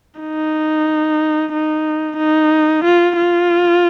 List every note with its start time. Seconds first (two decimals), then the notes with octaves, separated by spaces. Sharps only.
0.21 D#4
1.53 D#4
2.18 D#4
2.85 F4
3.17 F4